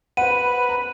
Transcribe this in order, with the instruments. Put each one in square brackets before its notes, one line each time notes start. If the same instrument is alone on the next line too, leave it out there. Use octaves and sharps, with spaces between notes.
[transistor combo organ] B4 [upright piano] C5 F#5 [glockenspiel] D#7
[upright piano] A#5